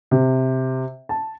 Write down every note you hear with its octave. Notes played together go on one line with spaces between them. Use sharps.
C3
A5